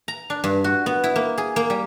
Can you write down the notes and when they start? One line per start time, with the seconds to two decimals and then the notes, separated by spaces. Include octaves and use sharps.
0.08 A#5
0.30 D4
0.44 G2
0.64 F#4
0.86 B3
1.04 E4
1.16 A#3
1.38 G#4
1.56 A#3
1.70 G3